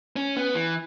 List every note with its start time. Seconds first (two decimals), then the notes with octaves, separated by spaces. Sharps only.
0.16 C#4
0.37 B3
0.54 E3